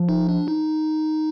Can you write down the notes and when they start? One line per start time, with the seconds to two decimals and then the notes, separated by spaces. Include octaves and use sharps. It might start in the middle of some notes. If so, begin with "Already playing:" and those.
Already playing: F3
0.09 D#4
0.29 D4
0.48 D#4